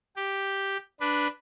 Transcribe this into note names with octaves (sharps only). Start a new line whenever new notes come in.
G4
D4 B4